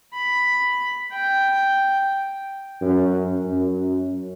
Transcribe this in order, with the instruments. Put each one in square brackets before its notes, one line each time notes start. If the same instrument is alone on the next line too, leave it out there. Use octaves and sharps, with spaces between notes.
[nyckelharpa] B5
G5
[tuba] F#2
F#2